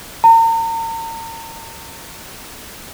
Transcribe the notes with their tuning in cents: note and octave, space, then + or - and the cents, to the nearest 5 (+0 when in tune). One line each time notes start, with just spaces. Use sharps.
A#5 -40